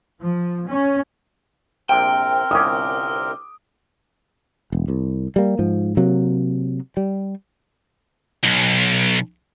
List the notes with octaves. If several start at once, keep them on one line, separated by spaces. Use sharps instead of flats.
F3
C#4
A#1 C3 C4 A#4 G5
G1 C2 C#4 D6 D#6
E1
C2
G3 A#3
G#2 F3
C3 F#3 A#3
G3
B1